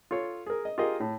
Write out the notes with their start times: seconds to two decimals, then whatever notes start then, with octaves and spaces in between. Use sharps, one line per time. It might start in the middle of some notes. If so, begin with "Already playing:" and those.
0.11 F4 A4 C#5
0.46 G#4 A#4
0.65 D#5
0.78 F4 G4 G#4 A#4 D#5
1.00 A2